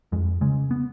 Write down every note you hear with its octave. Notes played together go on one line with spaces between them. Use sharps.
F2 G#3
C#3 G#3
B3